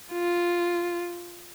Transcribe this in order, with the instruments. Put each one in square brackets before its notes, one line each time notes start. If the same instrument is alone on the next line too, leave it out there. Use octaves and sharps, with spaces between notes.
[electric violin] F4